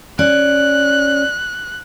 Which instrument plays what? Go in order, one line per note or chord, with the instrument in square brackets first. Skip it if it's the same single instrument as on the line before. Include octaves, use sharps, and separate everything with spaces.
[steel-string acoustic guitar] C#4 [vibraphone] D5 [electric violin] F#6